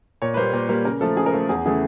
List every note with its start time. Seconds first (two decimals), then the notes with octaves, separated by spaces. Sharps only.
0.22 A#2 C#5
0.34 B4
0.37 G3 A#3 C5
0.53 A#2
0.69 G3 A#3
0.85 C#3 A#4
1.01 F3 A3 A4
1.17 C#3 G#4
1.26 A#4
1.33 F3 A3 A4
1.49 E2 G#4
1.65 C#3 E3 A3 G#4